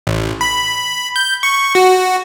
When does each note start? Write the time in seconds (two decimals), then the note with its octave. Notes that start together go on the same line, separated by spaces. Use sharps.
0.07 A1
0.41 B5
1.16 G6
1.43 C#6
1.75 F#4